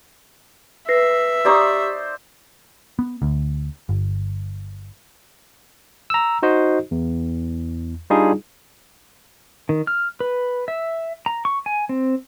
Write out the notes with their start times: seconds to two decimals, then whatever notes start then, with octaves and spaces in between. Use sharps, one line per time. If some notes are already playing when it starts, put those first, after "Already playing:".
0.89 B4 E5 A#6 C7
1.45 D#4 G4 C5 D5 C#6
2.99 B3
3.22 D2
3.89 G1
6.10 A#5 E6
6.42 D#4 F#4 C5 D#5
6.91 E2
8.10 G3 D4 D#4 F4 G#4
9.69 D#3
9.87 F6
10.20 B4
10.68 E5
11.26 A#5
11.45 C#6
11.66 G#5
11.89 C4